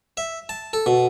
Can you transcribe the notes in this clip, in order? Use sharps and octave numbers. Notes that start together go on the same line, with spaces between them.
E5
A5
A4
B2